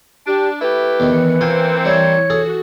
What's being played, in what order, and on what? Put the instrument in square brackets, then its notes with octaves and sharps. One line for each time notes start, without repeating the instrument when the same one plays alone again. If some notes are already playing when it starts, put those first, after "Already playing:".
[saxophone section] D4 [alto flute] G4
[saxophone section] A3 E4 G4 [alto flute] B4
[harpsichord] E2 D#3 [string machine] E3 C#7
[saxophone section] A#3 C4 [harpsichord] F4 G#5
[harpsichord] G3 E4 [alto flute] C#5
[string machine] F#4 [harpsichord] G#4 A4